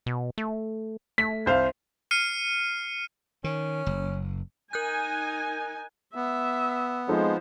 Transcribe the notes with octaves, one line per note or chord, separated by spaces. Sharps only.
B2
A3
A3 B6
C2 C5 F5
F6 C7 C#7 D#7
D#3 C#4
F#1
D#4 A#4 G#5 F#6 G6
B3 E5
F3 G#3 C4 D#4 A4 C5